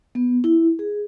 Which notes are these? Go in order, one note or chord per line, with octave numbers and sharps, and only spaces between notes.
B3
E4
G#4